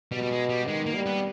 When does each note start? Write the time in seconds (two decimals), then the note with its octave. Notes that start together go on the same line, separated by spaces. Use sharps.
0.12 B2 G3
0.23 G3
0.31 G#3
0.49 G3
0.68 D#3 G#3
0.86 A#3
0.95 G3
1.06 B3